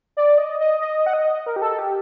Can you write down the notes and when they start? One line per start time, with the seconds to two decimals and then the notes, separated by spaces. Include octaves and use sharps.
0.17 D5
0.38 D#5
0.60 D#5
0.81 D#5
1.06 F#5
1.13 D#5
1.46 A#4
1.56 G4
1.62 A4
1.79 G4